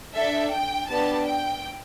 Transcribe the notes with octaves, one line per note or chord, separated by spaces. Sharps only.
D4 A4 E5
G5
B3 D4 G4 A5
G5